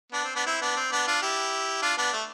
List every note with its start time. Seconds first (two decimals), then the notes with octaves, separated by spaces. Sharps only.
0.12 B3 D4
0.24 C4
0.35 B3 D4
0.46 C4 E4
0.61 B3 D4
0.77 C4
0.92 B3 D4
1.07 D4 F4
1.22 E4 G4
1.82 D4 F4
1.98 B3 D4
2.13 A3